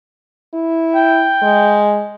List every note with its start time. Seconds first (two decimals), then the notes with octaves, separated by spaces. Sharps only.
0.54 E4
0.95 G5
1.42 G#3